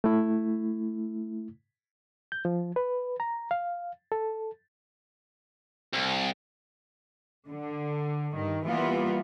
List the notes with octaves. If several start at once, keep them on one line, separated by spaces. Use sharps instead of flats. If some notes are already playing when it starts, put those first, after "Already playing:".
A3 E4
G6
F3
B4
A#5
F5
A4
C2
D3
G2 D#3
E3 G3 A#3 B3 F4